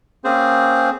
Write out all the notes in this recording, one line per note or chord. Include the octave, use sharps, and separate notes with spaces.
A#3 C4 C#4 G#4 C5